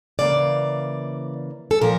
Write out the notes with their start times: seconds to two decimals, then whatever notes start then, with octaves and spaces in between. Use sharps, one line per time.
0.19 C#3 E3 A#3 D5
1.71 A4
1.82 A#2 F3 A#4